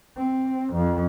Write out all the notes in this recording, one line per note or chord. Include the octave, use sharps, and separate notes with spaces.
C4
F2